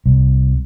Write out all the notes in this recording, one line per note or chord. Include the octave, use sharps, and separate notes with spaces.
C2